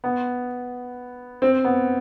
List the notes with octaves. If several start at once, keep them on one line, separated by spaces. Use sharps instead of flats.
B3
C4
B3